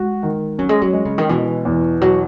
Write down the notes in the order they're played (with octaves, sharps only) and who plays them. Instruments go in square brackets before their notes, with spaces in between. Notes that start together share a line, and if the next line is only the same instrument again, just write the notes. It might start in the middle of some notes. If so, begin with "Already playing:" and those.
Already playing: [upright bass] G#3 [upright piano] F#4
[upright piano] D#3
[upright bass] F#3 [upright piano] C#4
[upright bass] G#3
F#3
[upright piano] G#3
[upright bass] C#3
D#3
[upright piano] B2 [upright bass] E3
[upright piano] E2
[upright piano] B2 [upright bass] F#3